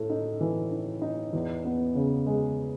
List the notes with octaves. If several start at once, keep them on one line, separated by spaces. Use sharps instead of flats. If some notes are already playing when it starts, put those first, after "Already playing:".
Already playing: A2 A3
D#4
E3
D#4
D#4
E2
B3
C#3
G#3